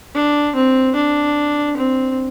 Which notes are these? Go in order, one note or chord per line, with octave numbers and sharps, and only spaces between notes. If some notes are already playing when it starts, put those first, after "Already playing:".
D4
C4
D4
C4